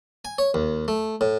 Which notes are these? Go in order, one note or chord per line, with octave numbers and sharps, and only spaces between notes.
G#5
C#5
D#2
A3
A2